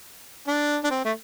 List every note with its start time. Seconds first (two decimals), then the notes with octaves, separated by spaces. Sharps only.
0.47 D4
0.84 D4
0.91 C4
1.05 A3